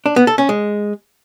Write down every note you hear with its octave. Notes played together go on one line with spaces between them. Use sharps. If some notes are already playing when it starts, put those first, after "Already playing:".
D4
B3
A4
C#4
G#3